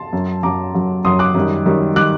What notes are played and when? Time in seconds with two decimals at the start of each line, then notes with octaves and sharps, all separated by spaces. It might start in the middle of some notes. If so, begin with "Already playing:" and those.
Already playing: A5 C6
0.13 F#2 F#3
0.43 F#2 F#3 A#5 D6
0.74 F#2 F#3
1.05 F#2 F#3 C6 D#6
1.19 D6 F#6
1.35 F#2 D#3 G3
1.66 F#2 D#3 G3
1.96 D#3 G3 D6 F#6